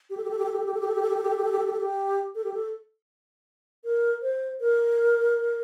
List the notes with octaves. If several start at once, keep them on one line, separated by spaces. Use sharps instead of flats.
G4
A4
G4
A4
G4
A4
G4
A4
G4
A4
G4
A4
G4
A4
G4
A4
G4
A4
G4
A4
G4
A4
G4
A4
G4
A4
G4
A4
A#4
C5
A#4